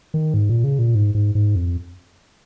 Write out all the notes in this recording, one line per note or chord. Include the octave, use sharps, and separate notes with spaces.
D#3
G#2
A#2
C#3
A#2
G#2
G#2
G#2
F2